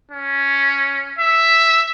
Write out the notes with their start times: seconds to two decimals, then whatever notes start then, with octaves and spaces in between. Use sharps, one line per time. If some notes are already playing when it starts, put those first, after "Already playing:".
0.11 C#4
1.19 E5